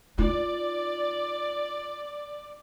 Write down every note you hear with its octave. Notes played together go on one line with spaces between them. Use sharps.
D#4 F4 D5